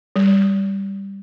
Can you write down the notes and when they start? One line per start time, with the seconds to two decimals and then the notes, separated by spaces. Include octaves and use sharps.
0.16 G3